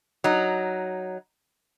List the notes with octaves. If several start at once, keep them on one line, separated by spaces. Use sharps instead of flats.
F#3 D#4